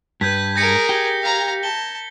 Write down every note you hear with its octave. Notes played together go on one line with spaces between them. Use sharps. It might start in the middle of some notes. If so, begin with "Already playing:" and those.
G2 B4 G6 G#6 B6
G#4 A#4 G6 A#6 C#7
G4
F5 A#5
A5 G7